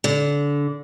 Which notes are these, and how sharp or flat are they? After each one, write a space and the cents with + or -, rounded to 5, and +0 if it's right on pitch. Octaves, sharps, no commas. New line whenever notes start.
D3 -25